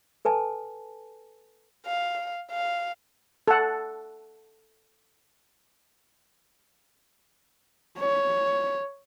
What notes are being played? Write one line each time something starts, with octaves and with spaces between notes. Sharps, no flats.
A4 B4 G#5 A5
F5
F5
A4 F#5
C#5